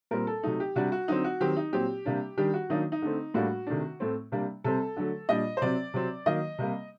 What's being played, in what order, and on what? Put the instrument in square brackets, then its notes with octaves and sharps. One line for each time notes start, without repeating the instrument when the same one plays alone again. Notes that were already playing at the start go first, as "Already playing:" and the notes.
[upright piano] A#2 G3 C4 A#4
A4
C3 F#3 A3 D#4
G4
C3 G3 D4 F#4
F#4
D3 F#3 C4 D#4
F#4
D#3 F#3 C4 G4
D#4
A#2 F#3 C4 G4
C3 G3 A#3 D4
D#3 G3 D4 G4
F#4
D#3 F#3 A#3 D4 D#4
D#4
D3 A3 C4
A2 G3 A#3 D4 F#4
C3 D#3 A3 D4
A2 A3 C4
C3 G3 A#3 D4
C3 G3 C4 A4
D3 F#3 A3
A#2 G3 D4 D#5
C5
C3 F#3 C4 D5
C3 F#3 C4
D#3 F#3 A#3 D#5
C3 G3 A#3